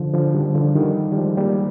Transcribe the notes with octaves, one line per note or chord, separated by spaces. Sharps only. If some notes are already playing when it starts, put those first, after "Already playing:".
Already playing: D3 F3
D3 F3
D#3 G3
D3 F3
D#3 G3
G3
F3 G#3
G3 A#3